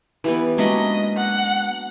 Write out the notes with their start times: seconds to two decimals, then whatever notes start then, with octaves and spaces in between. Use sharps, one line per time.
0.24 E3 G3 B3
0.58 F#3 G#3 A#3 C#4 D4 D#5 E5
1.16 F#5